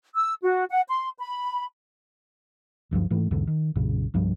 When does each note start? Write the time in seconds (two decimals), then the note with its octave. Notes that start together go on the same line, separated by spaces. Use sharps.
0.15 E6
0.42 F#4
0.70 F#5
0.88 C6
1.18 B5
2.91 F#1 D2 G2 F3
3.10 G#2 E3 A3
3.31 B1 E2 G#2 D3
3.47 D#3
3.76 B1 F#2 A#2 C#3
4.14 C2 G2 F3 G3